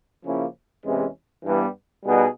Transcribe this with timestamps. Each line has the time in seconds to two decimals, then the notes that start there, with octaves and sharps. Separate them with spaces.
0.25 C#3 F3 A#3 C#4 E4
0.85 E2 C3 E3 G#3 C#4
1.44 G2 E3 G3 B3
2.05 B2 G3 B3 D#4 G#4